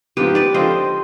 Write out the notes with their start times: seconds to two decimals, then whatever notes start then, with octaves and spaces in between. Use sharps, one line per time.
0.17 G#2 F3 B3 G4 B4
0.35 B4 D5
0.54 D3 F3 C4 F4 C5 D#5